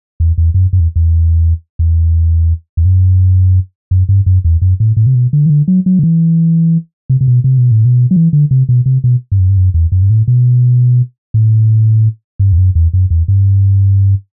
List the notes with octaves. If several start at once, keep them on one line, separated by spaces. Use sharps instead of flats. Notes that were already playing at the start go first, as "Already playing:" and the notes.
E2
E2
F#2
F#2
E2
E2
E2
E2
F#2
F#2
G2
F#2
E2
F#2
A2
A2
C3
B2
D3
E3
D3
F#3
F#3
D3
E3
C3
C3
B2
C3
B2
A2
B2
F#3
E3
D3
C3
B2
C3
B2
G2
F#2
G2
F#2
E2
F#2
G2
A2
B2
A2
G2
E2
F#2
E2
F#2
E2
G2